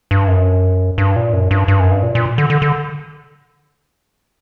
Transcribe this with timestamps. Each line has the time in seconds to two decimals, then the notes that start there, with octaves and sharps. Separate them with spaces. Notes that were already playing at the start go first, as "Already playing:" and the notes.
0.11 G2
0.28 F#2
0.98 G2
1.16 A#2
1.33 F#2
1.51 G2
1.68 G2
1.80 F#2
1.91 G2
2.03 A#2
2.15 A#2
2.38 D3
2.50 D3
2.62 D3